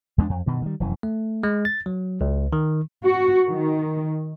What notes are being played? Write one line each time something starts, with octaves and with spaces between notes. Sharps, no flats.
E2 G#3 A#3 D4
F2
G2 B2 D#3
D#3 G3
F1 F#2 E3
A3
G#3
A6
F#3
C#2
D#3
F#4
D#3